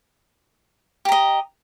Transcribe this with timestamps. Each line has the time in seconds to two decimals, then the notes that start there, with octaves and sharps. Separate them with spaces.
1.05 G4
1.09 A#5
1.12 D#5